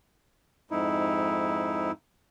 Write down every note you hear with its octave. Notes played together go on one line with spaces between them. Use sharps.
F2 G#2 D#4 E4